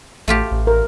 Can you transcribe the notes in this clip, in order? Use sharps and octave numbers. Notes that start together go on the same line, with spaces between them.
A1 A3 F4 G4
A1
A#4